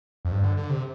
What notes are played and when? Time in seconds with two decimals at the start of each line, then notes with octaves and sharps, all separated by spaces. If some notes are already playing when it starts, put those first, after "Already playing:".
0.25 F2
0.31 G2
0.44 D3
0.57 D3
0.69 C3